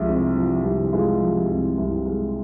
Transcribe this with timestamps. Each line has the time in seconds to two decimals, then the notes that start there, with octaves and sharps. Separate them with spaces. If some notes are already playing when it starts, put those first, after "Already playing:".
Already playing: C2 F3 G#3
0.08 C3
0.36 F3
0.64 C2
0.93 G#3 F4
1.21 F3
1.50 C2
1.78 C2
2.06 G#3